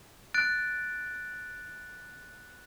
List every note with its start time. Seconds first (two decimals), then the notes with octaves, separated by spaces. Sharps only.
0.34 F#6 A6 D7